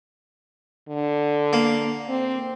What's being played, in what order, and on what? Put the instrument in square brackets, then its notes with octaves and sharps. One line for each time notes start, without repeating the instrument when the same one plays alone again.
[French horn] D3
[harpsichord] A#3
[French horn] C4